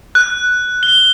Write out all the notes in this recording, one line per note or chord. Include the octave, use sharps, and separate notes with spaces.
F#6
G7